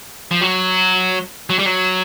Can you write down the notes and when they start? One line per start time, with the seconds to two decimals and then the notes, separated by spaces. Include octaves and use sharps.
0.31 F3
0.41 F#3
1.50 F#3
1.59 G3
1.66 F#3